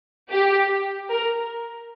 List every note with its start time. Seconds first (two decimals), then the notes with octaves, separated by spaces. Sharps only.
0.31 G4
1.10 A#4